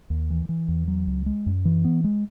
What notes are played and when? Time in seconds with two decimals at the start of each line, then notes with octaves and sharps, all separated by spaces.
0.10 D#2
0.30 E3
0.49 E3
0.68 E2
0.88 F#3
1.07 C#2
1.26 G#3
1.46 F#2
1.65 E3
1.84 B3
2.04 G#3